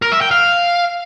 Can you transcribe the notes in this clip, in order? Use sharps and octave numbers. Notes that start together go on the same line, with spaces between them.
A#4
E5
G5
F5